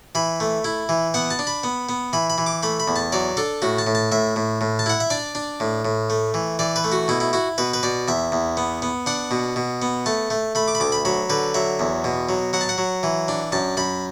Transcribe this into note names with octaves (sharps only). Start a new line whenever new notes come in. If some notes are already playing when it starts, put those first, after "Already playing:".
E3 B5
A3
E4
E3
B3 F#5
A5
D4
B5
B3
B3
E3 B5
B5
E3
D6
A3 B5
B5
E2
A5
F#3 D5
D4 A4
A2 F#4
A5
A2
A5
A2 E5
A2
A2
A5
E4 F#5
E5
D4 D5
D4
A2
A2
A3
E3
E3 D5
B4
A3
F#4
B2 E4
E4
E4 F#4
B2 B4
B4
B2 D5
E2 E5
E2
B3
B3
D4 F#5
B2
B2
B3
A3 A5
A3
A3 B5
D6
B5
D2 D6
B5
F#3 B5
D3 B4
F#3 E5
E2
B2
F#3
F#3 F#5
A5
F#5
F#3
E3
D4
F#2 A5
F#2 B5